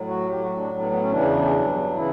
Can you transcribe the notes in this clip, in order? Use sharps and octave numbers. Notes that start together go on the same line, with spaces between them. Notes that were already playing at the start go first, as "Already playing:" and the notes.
Already playing: A2 F#3
F#4
A2 F#3 G4
F#4
D4
A2 F#3
B3
B3
C#4
E2 C#3 E3 D4
G2 F#3
C#3 E3 E4